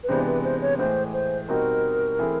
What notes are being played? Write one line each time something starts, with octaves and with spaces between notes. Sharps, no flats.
B4
C3 E3 G#3 B3 D4 C5
B4
C5
C#5
A2 E3 G#3 C5
C5
B2 G3 C4 D#4 F#4 A#4
E3 A3 C4 E4 G#4